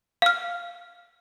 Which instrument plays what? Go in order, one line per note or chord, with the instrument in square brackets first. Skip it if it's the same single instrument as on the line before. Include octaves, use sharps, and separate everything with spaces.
[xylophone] F5 F6